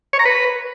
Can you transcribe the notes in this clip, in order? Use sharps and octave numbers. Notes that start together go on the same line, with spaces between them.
C#5
A#5
B4